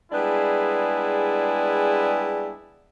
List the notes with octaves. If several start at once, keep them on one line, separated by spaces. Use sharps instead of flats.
G3 G#3 B3 D4 E4 G#4